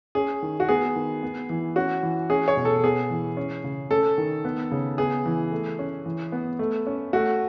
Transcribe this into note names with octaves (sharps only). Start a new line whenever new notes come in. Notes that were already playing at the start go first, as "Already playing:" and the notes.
C#4 G#4
D#3
F#4
B3 G#4
D#3
B3
E3
C#4 F#4
E3
C#4 G#4
C#5
B2
A4
B3 G#4
E3
C#4
C#3
C#4 A4
D#3
B3
C#3
B3 G#4
E3
A3
C#4
E3
B3
A3
C#4
A3 F#4